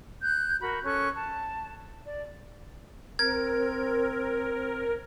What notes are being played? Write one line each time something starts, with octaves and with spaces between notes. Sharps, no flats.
F#6 G6
F#4 A#4 B5
C#4 A4 C#6 F#6
A5
D5
C4 A#4 G#6